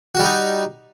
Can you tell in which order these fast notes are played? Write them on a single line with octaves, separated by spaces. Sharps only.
F#4 G3 D#4